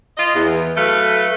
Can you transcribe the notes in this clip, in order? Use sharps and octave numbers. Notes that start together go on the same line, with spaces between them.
F4 D#5
E2
F#3 A3 A4 B4 F5